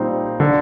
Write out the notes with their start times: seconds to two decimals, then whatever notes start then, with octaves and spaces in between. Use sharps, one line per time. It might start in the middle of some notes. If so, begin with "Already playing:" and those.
Already playing: A#2 G3 C4 D#4
0.40 D3